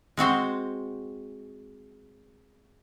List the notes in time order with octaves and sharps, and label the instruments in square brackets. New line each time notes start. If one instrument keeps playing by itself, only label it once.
[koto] G#3 C4 F#4 C5